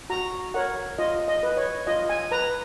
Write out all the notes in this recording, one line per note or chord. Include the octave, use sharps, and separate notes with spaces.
F#4 A#5
A#4 C#5 F#5
F4 D#5
D#5
B4
C#5
F4 D#5
G#5
B4 A#5